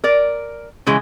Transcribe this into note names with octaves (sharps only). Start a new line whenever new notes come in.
A#4 D5
C#3 E3 G#3